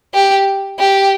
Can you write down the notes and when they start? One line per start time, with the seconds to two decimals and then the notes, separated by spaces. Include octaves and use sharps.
0.14 G4
0.79 G4